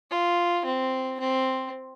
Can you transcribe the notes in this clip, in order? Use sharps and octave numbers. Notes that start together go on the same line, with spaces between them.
F4
C4
C4